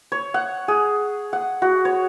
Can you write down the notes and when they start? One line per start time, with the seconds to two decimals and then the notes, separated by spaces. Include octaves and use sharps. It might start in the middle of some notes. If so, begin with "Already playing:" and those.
0.12 C#5
0.34 F#5
0.68 G#4
1.33 F#5
1.62 F#4
1.85 C#5